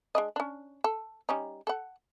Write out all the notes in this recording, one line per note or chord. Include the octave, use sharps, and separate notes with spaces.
G#3 D4 D#5
C#4 D4
A4
G3 C#4 D#4
A4 F#5